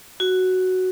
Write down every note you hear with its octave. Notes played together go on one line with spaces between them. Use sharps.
F#4